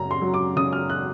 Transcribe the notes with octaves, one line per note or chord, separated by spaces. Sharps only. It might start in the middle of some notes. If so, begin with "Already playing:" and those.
Already playing: F#2 C#3 A#5
C6
F#3
D6
C#3 D#6
F6
F#6